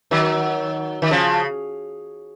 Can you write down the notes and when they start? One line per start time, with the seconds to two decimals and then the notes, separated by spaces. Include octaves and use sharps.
0.11 D#3 F#3
1.02 D#3
1.11 C#3 F3